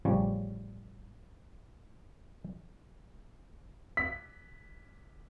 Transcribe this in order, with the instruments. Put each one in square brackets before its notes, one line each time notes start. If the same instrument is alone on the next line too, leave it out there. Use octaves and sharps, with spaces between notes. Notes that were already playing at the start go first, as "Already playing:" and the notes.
[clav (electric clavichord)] A1 C#3 F3 G3 C#5
[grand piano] B6